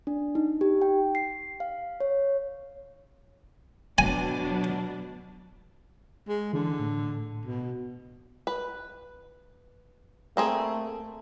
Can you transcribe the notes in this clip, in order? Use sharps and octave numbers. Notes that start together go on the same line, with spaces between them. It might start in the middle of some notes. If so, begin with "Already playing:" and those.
D4
D#4
G4
G5
C7
F5
C#5
B2 F#3 D4 G#5
G#3
D3 E3
A2
B2
B4
A3 A#3 C4 G#4